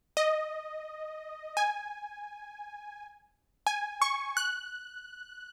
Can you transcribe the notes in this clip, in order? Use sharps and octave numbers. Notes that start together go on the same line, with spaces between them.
D#5
G#5
G#5
C#6
F#6